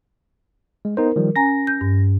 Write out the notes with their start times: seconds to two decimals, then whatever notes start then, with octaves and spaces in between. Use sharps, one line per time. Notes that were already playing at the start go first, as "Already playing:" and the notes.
0.85 G#3
0.97 B3 D#4 A#4 C5
1.16 D#3 F3 G3
1.36 C#4 G#5 A#5 A#6
1.67 G6
1.81 G2